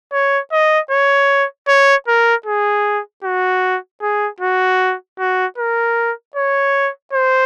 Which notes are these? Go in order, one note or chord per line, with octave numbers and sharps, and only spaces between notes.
C#5
D#5
C#5
C#5
A#4
G#4
F#4
G#4
F#4
F#4
A#4
C#5
C5